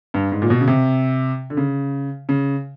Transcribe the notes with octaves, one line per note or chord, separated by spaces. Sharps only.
G2
G#2
A#2
B2
C#3
C3
D3
C#3
C#3